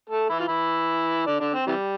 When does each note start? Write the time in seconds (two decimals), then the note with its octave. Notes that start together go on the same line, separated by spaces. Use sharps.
0.10 A3 A4
0.30 E3 E4
0.40 F4
0.48 E3 E4
1.27 D3 D4
1.40 D3 D4
1.54 C4
1.67 C3 E3 G3